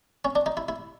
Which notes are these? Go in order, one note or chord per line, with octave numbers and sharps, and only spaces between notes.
C#4
D4
D#4
E4
E4